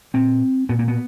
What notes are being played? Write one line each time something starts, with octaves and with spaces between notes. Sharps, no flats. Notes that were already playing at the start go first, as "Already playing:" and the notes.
A#2 C4
A#2 B3
A#3
B3